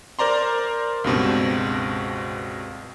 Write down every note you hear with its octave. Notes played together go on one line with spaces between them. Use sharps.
A#4 C5 D5 A#5 C6
C#2 G2 B2 C4